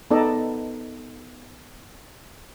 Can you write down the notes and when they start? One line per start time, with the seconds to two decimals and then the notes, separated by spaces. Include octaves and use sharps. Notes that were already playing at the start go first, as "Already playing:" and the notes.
0.11 B3 D#4 A4 D5 D#5 A5